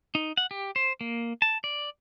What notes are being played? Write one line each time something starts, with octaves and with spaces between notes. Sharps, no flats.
D#4
F#5
G4
C5
A#3
A5
D5